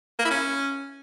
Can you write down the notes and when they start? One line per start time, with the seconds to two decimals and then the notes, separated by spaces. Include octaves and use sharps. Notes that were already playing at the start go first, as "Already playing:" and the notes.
0.19 A#3
0.25 E4
0.30 C#4